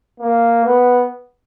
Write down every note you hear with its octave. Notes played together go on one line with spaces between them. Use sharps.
A#3
B3